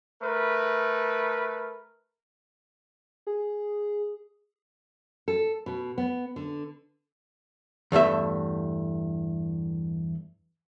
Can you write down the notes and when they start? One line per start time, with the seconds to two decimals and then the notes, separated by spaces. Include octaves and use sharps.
0.21 A3 A#4 B4
3.27 G#4
5.28 A4
5.66 B2
5.98 B3
6.36 D3
7.92 E2 G2 A3 E5